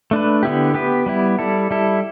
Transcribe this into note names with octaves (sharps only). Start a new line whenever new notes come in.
A3 D4 B4
D3 B3 E4 G4
B3 G4 B4
G3 B3 E4
G3 E4 A4
G3 E4 A4